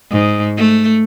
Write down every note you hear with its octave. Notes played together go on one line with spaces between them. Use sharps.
G#2
A3